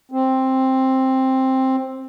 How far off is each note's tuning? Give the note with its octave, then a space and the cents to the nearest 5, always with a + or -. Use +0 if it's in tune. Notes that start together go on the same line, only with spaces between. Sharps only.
C4 +10